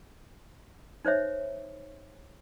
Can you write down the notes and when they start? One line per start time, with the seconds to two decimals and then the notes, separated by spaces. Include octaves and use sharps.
1.05 D#4 C5 C#5 E5